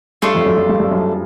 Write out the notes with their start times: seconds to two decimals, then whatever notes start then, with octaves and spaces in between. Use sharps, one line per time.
0.22 G2 A3 D4 F4 A4
0.34 F2
0.46 F#2
0.58 F#2
0.69 G2
0.80 G2
0.91 F#2